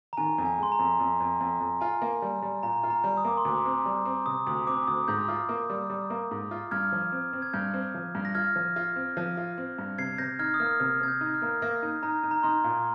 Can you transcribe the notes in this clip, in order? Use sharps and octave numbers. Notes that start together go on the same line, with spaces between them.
A#5
D#3 G#5
F2
G#5
G#3 C6
A#5
F2
F2
F2
F2
F2
F4 G#5
A#3
G3
G3
A#2 A#5
F4
A#5
G3
D#6
A#3 D6
C6
D2 D6
C4
G3
C4
C3 D#6
D2 D#6
C4 D6
D2 D#6
G#2 G6
F4
A#3
G3
G3
A#3
G#2
F4
G2 F6 G#6
F3
C4
C4
G#6
G2 G6
C4
F3
G2
A#6
F4 F6 G#6
F3
F4
C4
F3
F4
C4
G2
C3 G#6 C7
C3 G6 A#6
D#4 F6 G#6
D#6
A#3 F6
C3 F6
C3 G#6
G6
D#4
F6
A#3
A#3
D#4
D#4 A#5
D#4
A#5
D#4 C6
A#2